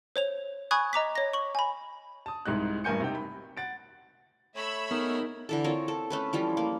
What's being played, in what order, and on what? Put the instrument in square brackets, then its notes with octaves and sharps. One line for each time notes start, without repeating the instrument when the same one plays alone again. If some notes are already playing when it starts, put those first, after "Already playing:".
[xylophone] C5 C#5 F7
G#5 B5 C#6 D#6 F#6 G#6
D#5 A#5 D6 B6
C#5 A#6
C#6 F#7
G#5 B5
[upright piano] A5 D#6
C2 G#2 D#4 F#6
A1 G2 A#4 G#5 G6 C#7
C3 D#4 G5
B5
F#5 A6 D7
[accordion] A3 C#5 [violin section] E5 B5 E6
[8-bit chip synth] B3 [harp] D#4 G#4 A#4
[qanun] D3 E3 A4
C4 F4 A#4 C#5
A4
A3 C#4 B4
E3 F3 G3 F4
A#3